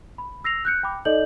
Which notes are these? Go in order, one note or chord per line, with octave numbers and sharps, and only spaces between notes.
B5
E6 A#6 C7 F7
F#6 G6 C#7
G5 B5 D6
D#4 A4 D5 D#5 G6 F#7